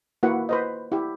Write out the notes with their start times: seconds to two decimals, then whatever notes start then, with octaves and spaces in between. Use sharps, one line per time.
0.23 A#3 E4 F#4 B4 F#5
0.49 B4 C5 D#5
0.92 E4 G4